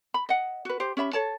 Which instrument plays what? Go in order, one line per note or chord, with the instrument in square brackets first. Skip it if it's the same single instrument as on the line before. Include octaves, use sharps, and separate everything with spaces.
[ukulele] B5
D#5 F#5
F#4 B4
G4 C5
C#4 G4 E5 B5
A4 C#5 A5